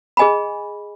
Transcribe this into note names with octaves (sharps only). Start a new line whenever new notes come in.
G#4 D#5 G#5 B5